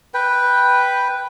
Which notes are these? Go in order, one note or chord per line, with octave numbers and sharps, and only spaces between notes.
B4 G5